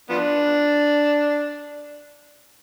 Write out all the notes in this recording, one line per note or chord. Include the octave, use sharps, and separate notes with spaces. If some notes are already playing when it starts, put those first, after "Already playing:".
F3 B3 D4